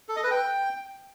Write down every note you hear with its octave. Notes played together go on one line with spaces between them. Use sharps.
A4
D#5
B4
G5